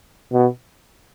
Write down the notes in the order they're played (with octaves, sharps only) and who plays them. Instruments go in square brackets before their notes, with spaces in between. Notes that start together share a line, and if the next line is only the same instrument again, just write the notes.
[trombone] B2